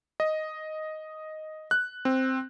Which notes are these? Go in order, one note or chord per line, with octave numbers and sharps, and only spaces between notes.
D#5
F#6
C4